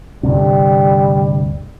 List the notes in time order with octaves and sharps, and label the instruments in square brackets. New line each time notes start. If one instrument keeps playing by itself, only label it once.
[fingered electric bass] D2 G2 C3 [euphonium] G3